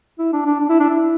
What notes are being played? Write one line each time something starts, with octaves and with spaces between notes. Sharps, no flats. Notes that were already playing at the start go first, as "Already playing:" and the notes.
E4
D4
D4
D4
E4
D4
E4